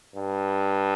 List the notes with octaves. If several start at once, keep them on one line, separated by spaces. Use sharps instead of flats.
G2